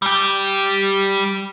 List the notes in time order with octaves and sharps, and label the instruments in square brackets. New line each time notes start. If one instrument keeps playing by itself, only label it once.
[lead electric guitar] G3 G4